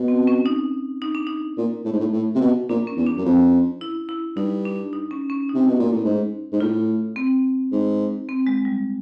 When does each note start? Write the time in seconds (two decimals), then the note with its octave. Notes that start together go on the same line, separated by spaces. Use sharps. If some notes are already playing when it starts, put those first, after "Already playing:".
Already playing: B2
0.08 C4
0.27 C#4
0.46 D#4
1.02 D#4
1.15 D4
1.27 D#4
1.58 A#2
1.85 A2
1.93 G#2
2.00 A2
2.13 A2
2.35 C3
2.41 B2
2.69 A#2 D4
2.87 C#4
2.97 E2
3.06 D4
3.17 F#2
3.25 F2
3.81 E4
4.09 E4
4.36 G2 D#4
4.65 D4
4.93 D#4
5.11 C#4
5.30 C#4
5.49 D#4
5.55 C3
5.68 B2
5.80 A#2
5.92 A2
6.04 G#2
6.53 G#2
6.60 A2 F4
7.16 C4
7.72 G#2
8.29 C4
8.47 G#3
8.65 G3